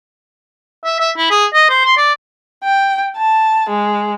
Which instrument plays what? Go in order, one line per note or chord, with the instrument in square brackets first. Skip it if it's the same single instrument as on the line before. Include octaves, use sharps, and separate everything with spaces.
[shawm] E5
E5
E4
G#4
D#5
C5
C6
D5
[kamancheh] G5
A5
G#3